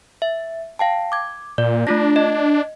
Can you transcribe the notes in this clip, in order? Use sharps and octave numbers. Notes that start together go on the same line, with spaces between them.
E5
F5 G5 A5
D6 G#6
A#2 D5
A3 D4 F4 A#6
D#5